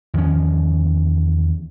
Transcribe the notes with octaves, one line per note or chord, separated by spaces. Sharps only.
E2 D#3 F3 C#4